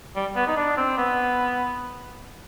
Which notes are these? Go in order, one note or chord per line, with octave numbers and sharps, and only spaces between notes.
G3
B3
D#4
D4
C4
B3